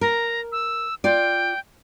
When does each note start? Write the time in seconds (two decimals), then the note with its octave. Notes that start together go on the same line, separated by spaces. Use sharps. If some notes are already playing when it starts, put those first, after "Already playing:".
0.01 A#4 A#5
0.52 E6
1.04 F4 D5 G5